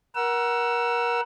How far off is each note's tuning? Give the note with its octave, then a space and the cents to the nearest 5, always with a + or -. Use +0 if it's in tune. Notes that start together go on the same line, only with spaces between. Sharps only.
A#4 +30 F#5 +10 E6 +20